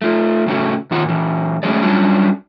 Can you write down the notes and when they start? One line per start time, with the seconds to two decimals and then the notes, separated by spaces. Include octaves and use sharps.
0.02 A3 F4
0.46 A2 C#3 A3 C#4 F4 F#4
0.91 C3 D#3 F4 F#5
1.04 A#2 E3
1.63 F#3 G#3 A3 C#4 G#4 D5
1.82 F#3 G3 C#4 D4 F4 F#4